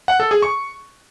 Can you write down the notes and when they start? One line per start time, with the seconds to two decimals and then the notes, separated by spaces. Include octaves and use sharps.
0.08 F#5
0.20 A4
0.31 G#4
0.42 C#6